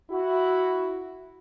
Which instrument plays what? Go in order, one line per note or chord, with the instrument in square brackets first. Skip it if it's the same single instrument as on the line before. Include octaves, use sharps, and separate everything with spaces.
[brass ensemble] E4 F#4